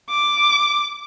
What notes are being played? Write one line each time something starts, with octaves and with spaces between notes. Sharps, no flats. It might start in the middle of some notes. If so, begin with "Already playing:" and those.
D6